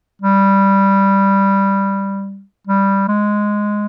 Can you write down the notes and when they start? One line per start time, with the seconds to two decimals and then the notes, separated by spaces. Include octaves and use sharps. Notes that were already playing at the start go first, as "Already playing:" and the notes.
0.22 G3
2.67 G3
3.08 G#3